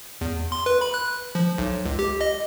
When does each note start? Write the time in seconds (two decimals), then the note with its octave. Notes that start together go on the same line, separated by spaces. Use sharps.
0.21 E2
0.52 C6
0.66 B4
0.81 B5
0.94 F#6
1.35 F3
1.58 B1
1.86 C#2
1.99 G4
2.21 D#5